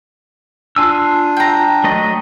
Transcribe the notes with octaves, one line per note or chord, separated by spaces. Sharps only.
D4 F4 G#5 E6
G5 A#5
F#3 A3 D#5